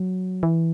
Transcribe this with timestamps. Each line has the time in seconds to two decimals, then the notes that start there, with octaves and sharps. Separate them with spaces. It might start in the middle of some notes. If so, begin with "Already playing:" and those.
Already playing: F#3
0.43 E3